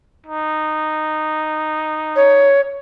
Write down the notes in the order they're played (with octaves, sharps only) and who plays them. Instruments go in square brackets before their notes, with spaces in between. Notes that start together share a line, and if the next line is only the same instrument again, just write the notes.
[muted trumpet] D#4
[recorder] C#5